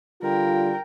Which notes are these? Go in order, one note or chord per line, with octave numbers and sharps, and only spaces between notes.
D3 G3 F4 A#4 G5